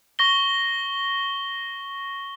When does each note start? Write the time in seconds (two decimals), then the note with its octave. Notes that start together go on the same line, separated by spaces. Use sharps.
0.19 C#6 A#6 G7